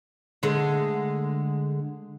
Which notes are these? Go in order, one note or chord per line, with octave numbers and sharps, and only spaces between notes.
D3 G#3 A3